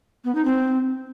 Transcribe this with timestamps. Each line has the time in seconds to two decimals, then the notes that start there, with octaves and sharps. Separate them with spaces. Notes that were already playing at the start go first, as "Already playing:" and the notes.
0.25 B3
0.35 D#4
0.45 C4